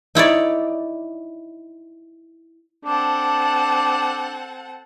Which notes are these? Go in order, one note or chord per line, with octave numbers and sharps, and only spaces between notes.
D#4 E4 C#5 D5
C4 D4 A4 F#5